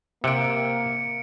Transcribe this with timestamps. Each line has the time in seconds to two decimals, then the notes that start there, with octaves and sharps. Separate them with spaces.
0.24 C3 A#3 F#5 C#7 D7